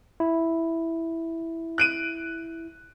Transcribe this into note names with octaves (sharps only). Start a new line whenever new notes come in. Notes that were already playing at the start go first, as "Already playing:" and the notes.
E4
F#6 D7 D#7